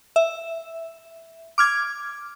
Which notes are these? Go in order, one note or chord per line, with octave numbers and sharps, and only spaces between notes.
E5
D6 F6 G#6